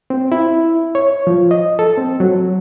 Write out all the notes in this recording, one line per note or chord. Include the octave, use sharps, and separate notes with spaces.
C4
E4
C#5
F3
D#5
A4
C4
F#3